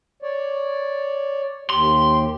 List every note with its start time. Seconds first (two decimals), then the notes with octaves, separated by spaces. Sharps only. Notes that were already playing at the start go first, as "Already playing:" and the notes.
0.22 C#5 D5
1.70 D#2 G4 C6